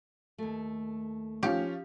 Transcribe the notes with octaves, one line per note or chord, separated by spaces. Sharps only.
D#2 A3
F3 C#4 F4 G4